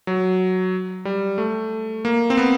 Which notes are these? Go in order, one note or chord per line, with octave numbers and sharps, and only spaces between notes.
F#3
G3
A3
A#3
C4
B3